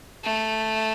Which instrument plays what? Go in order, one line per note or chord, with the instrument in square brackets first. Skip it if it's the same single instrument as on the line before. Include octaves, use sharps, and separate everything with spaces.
[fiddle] A3